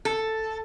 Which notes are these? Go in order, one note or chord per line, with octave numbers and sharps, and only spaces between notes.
A4